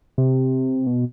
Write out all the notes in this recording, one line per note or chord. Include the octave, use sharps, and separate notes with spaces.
C3
B2